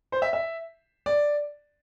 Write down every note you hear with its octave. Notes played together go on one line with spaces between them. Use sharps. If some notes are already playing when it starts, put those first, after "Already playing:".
C5
E5
E5
D5